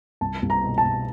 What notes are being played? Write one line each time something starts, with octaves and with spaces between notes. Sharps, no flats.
C2 A5
C2
A#5
B2
A5
B2